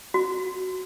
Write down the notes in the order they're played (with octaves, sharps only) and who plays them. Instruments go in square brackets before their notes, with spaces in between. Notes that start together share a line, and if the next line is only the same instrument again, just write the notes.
[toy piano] F#4